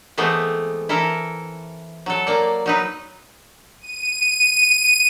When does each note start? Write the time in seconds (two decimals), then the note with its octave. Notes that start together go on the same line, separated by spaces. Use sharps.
0.17 E3 G#3 A3 B3 C4
0.89 E3 E4 A4 A#4
2.06 F#3 A4
2.27 A#3 D5
2.66 F#3 D#4 B4
3.80 D#7